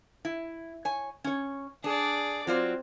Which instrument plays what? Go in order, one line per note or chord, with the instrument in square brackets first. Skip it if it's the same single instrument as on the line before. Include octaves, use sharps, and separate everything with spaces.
[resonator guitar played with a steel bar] E4
C#5 G#5
C#4 C#5
[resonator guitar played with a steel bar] D4 [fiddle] G#4 D5
[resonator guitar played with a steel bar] F#3 F4 D5 [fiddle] C4